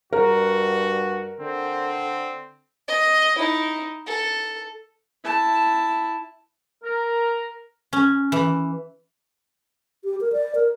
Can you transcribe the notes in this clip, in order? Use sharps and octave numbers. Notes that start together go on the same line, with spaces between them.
G2 F#4 A#4
D3 C4
D#5
D#4 E4
A4
E4 A5
A#4
C#4
E3
G4
A#4
D5
A#4